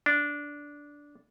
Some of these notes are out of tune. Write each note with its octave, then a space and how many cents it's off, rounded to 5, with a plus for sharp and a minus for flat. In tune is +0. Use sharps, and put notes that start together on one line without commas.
D4 -10